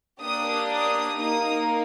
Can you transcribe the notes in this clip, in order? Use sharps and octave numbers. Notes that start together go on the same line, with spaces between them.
A#3 D4 G4 D#6
D#6
A#3 D#4 D#6